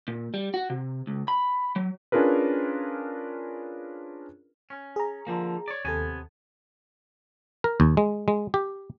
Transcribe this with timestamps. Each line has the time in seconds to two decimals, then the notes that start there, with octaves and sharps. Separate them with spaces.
0.08 A#2
0.34 G3
0.54 F#4
0.70 C3
1.07 C#2
1.28 B5
1.76 F#3
2.12 C#4 D4 F4 G#4 A#4 B4
4.70 C#4
4.96 G#4 A#5
5.27 D3 F3 A#3
5.68 C#5 D5
5.85 D#2 C3 B3 A4 G#5
7.64 A#4
7.80 D#2
7.97 G#3
8.28 G#3
8.54 G4